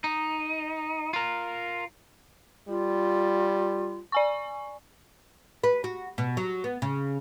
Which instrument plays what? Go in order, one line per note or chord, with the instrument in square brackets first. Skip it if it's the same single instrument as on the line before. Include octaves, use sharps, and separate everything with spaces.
[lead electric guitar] D#4
F4 A#4
[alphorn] G3 [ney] F4
[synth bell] D5 G#5 C#6
[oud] B4
F#4
B2
F#3
B3
C#3